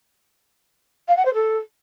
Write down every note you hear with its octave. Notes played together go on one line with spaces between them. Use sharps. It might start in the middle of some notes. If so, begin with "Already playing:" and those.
F5
F#5
C5
A4